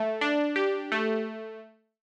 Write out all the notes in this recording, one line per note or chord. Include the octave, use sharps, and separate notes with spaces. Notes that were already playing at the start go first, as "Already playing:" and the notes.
Already playing: A3
D4
G4
A3